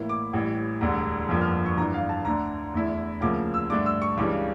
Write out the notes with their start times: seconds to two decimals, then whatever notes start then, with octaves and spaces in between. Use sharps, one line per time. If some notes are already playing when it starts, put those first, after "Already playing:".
Already playing: A2 E3 A#3 E4
0.09 D6
0.33 A1 A2 E3 G3
0.81 E1 D2 D3 G3
1.29 G1 F2 D3 F3 A#3
1.41 F6
1.66 C#6
1.77 G1 G2 E3 A#5
1.94 F5
2.09 A5
2.25 D2 D3 A3 A#5
2.74 E2 D3 A3 E4
3.21 D2 C#3 F3 A#3 D6
3.54 E6
3.70 G2 D3 A3 D4 D6
3.86 E6
4.02 C#6
4.17 C#2 C#3 E3 G3 D4 D6